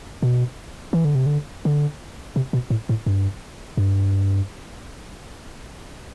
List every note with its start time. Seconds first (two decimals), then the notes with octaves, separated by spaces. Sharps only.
0.22 B2
0.93 E3
1.05 D3
1.15 C3
1.26 D3
1.65 D3
2.36 C3
2.53 B2
2.70 A2
2.89 A2
3.06 G2
3.77 G2